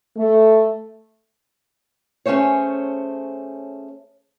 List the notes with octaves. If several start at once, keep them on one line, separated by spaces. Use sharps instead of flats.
A3
A3 C#4 G#4 C5 C#5